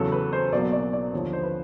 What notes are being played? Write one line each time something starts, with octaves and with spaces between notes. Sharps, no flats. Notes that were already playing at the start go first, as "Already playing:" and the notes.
Already playing: E2 C#3 F#3 A4
B4
C5
B1 B2 F#3 A#3 D5
D5
D5
D#2 D3 F3 C#5
C5
B4